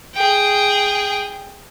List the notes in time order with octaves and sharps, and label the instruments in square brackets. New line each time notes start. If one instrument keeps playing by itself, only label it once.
[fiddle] G#4 G5